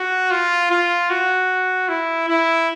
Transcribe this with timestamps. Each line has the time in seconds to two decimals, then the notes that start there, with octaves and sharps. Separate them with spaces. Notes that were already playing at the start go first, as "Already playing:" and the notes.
Already playing: F#4
0.31 F4
0.71 F4
1.10 F#4
1.89 E4
2.28 E4